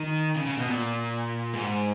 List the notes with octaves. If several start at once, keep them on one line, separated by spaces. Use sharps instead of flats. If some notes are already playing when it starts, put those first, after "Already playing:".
Already playing: D#3
C#3
C#3
B2
A#2
G#2